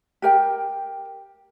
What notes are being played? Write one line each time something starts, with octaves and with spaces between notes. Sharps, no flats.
G4 A#4 G5